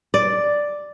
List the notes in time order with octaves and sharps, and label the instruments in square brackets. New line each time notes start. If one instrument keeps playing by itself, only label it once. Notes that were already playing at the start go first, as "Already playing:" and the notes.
[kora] D5